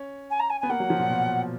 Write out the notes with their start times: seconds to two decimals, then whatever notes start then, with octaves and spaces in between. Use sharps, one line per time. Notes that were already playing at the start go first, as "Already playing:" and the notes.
Already playing: C#4
0.30 G#5
0.39 A#5
0.49 G#5
0.60 B3 G#5
0.69 A#3 F#5
0.80 F#3
0.90 F3
0.99 A#2
1.10 B2